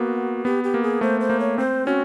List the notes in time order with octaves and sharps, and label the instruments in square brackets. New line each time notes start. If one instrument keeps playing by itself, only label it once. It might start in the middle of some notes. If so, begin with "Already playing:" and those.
Already playing: [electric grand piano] A#3 B3 [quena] F#4
[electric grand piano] B3 [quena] G4
[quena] G4
[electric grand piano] A#3
[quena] G#4
[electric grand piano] A3 [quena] C5
[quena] C5
[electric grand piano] A#3
[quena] C#5
[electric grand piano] C4 [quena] C5
[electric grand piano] C#4 [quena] F#4